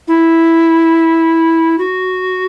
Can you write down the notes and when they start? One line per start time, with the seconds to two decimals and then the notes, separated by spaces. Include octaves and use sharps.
0.08 E4
1.78 F#4